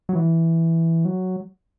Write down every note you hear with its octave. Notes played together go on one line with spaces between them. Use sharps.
F#3
E3
F#3